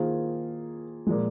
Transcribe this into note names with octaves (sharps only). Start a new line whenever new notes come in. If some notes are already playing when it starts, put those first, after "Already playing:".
Already playing: D#3 A#3 F4 G#4 C5
A#2 F3 G#3